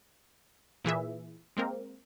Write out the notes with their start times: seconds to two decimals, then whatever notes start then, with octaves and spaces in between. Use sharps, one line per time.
0.85 A#2 E3 G#4 E5
1.57 G#3 A#3 C4 A#4